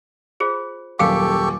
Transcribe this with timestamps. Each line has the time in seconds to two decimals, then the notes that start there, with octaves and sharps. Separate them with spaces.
0.40 F4 G#4 C5
0.99 D#1 F#2 G4 A4 F5 G5 C#6 D6